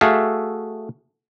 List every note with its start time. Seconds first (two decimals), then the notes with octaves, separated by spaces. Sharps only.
0.01 A3 F#4 G#4 A4 E5 F5